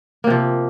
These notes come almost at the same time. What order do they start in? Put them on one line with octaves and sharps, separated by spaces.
A#3 C3 F3